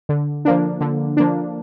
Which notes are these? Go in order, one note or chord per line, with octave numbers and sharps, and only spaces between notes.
D3
F3 A#3 D4
D3
F3 A#3 D4